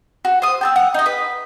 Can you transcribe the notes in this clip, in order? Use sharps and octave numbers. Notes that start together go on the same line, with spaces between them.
F#4
C5 D#6
G5 A5 E6
F#5
D#4 D#5
B4